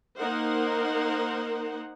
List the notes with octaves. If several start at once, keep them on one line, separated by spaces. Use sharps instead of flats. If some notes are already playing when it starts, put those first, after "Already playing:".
A#3 D#4 A#4 C5 F#5